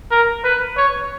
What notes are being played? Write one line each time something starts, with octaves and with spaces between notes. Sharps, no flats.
A#4
B4
C#5